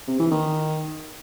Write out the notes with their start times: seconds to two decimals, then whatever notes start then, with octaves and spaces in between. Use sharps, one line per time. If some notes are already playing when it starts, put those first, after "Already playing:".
0.08 C3
0.19 E3
0.31 D#3